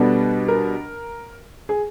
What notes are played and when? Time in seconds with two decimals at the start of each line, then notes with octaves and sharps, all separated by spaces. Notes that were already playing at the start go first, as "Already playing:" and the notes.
Already playing: B2 G3 B3 D4 A4
0.48 A#4
1.69 G#4